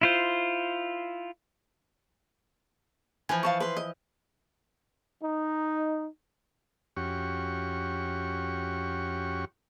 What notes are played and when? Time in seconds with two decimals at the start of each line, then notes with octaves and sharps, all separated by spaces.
0.01 E4 F4 C5
3.29 E3 F3 G#5
3.43 F5 A5 C#6
3.60 B4 C6
3.77 D#5
5.23 D#4
6.97 F2 C#4 F#4 G4 C#6